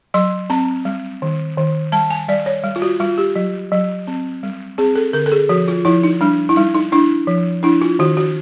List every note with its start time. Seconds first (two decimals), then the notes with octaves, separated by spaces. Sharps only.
0.14 F#3 C6
0.50 C4 A#5
0.85 G3
1.22 D#3
1.57 D#3
1.92 G3 A5
2.10 G#5
2.28 G3 D5
2.46 C#5
2.64 G3
2.76 F4
2.82 F#4
3.00 G3 F4
3.18 G4
3.36 F#3
3.72 F#3
4.07 C4
4.43 G3
4.78 C4 G#4
4.96 A4
5.13 D3 A#4
5.26 A4
5.32 G#4
5.49 F3 F#4
5.68 F4
5.85 F3 E4
6.04 D#4
6.21 G3 D4
6.49 E4
6.56 G3 D#4
6.74 D#4
6.92 D4 E4
7.27 F3
7.63 D4 E4
7.82 F4
7.99 D#3 F#4
8.17 F#4